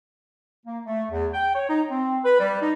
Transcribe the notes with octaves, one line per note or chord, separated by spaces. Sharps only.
A#3
A3
E2
G5
C#5
D#4
C4
B4
G3
D#4